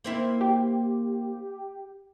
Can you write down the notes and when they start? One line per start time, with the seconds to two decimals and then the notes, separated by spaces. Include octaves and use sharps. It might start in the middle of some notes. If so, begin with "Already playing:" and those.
0.04 A#3 C4 E4
0.41 G4